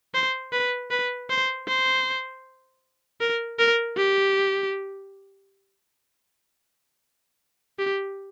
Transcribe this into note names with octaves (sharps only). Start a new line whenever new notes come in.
C5
B4
B4
C5
C5
A#4
A#4
G4
G4